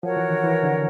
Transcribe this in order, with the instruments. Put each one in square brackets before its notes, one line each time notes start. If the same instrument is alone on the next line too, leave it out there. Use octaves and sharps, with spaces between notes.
[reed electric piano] F3 [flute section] F#4 A#4 C#5 F#5
[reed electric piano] E3
D#3
E3
D3